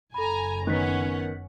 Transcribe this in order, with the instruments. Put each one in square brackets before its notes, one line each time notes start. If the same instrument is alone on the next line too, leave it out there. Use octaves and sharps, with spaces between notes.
[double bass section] F#1 [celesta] A4 B5 [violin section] G#5 A#5
[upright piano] D#3 B3 [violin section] C#4 F#5 [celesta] F#6 B6